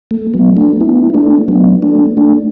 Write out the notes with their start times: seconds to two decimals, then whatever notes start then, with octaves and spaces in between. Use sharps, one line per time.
0.11 A3
0.34 F#3 B3
0.57 A3 D4
0.80 B3 E4
1.10 E4
1.14 A3 D4
1.48 F#3 B3
1.82 A3 D4
2.17 A3 D4